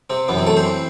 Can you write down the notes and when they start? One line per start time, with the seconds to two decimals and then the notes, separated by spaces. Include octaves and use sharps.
0.10 C3 C4
0.28 F#2 E3 B3
0.37 C3 C4
0.46 A3 A4
0.57 C4 C5
0.65 E3